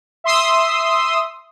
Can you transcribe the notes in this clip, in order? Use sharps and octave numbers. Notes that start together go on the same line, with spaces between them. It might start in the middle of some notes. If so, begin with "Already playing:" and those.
E5 C6 D#6 E6